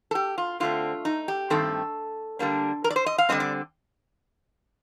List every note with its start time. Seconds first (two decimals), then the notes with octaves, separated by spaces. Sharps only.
0.11 A4
0.15 G4
0.38 F4
0.60 D3 A3 C4 F4
1.05 D#4
1.28 G4
1.50 G2 D#3 A3 C4 A4
2.39 D3 G3 A#3 D4
2.84 A#4
2.90 D5
2.96 C5
3.06 D#5
3.18 F5
3.29 D3 G3 C4 D#5
3.40 D5